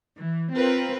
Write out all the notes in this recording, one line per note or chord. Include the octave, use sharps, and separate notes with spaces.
E3
C4 F4 A#4 B4